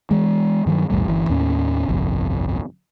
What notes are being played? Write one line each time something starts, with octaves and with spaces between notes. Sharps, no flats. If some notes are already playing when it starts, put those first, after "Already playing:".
E3 G#3
G2 D#3 F3 F#3
B1 E2 A2 G3
G1 E3
D#2 A2 C#4
G1 C2 F2